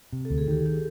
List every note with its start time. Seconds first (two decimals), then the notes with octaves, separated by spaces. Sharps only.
0.13 C3
0.25 A4
0.30 D2
0.38 G#4
0.48 D#3 G4 A4
0.66 G4 A4